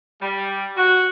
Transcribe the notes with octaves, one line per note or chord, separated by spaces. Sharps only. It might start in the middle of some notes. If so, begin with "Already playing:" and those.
G3
F#4